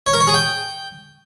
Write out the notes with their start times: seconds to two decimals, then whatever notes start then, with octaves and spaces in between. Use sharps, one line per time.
0.06 C#5
0.13 A#4
0.20 C#5
0.27 G#4
0.34 G5